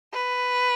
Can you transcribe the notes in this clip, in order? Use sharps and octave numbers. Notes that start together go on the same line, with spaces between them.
B4